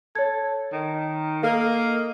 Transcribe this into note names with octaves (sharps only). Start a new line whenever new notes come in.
A4 C#5 G#6
D#3
A#3 A4 D#5